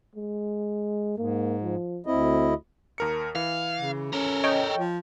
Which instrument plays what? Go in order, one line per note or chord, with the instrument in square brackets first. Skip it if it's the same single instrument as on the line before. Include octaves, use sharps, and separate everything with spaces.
[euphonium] G#3
[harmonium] G#2 [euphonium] A#3
[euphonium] F3
[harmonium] D2 E4 D#5 [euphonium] C4
[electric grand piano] D#2 A#4 C#7
[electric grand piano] E3 [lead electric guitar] F5
[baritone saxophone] C#3
[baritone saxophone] C#4 [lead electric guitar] A4 A#4
[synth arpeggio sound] C#5 D#5 G5
[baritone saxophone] F3